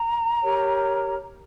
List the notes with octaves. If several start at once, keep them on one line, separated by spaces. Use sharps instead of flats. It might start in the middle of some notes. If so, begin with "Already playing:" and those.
Already playing: A#5
G4 A#4 C#5